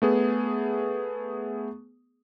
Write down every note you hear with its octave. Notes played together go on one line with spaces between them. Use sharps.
A3 B3 G#4